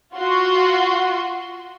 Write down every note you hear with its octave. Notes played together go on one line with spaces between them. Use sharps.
F4 F#4 C6